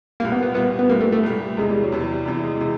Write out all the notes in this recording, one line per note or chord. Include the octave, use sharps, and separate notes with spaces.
C2 A#2 G3 A#3
B3
B3
C2 A#2 G3 B3
B3
C2 A#2 G3 A#3
A3
A3
C2 A#2 G3
E2 C3 E3 G#3
G3
F#3
E2 C3 E3 G3
E2 C3 E3 G3
G#3
C3 E3